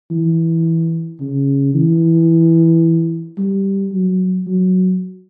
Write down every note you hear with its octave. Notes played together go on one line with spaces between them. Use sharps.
E3
C#3
E3
G3
F#3
F#3